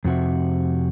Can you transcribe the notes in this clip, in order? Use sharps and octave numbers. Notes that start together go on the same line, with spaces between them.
F2 C3 F#4 E5